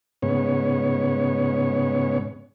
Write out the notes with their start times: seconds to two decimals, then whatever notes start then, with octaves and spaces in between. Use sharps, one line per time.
0.22 G#2 C#3 B3 C#5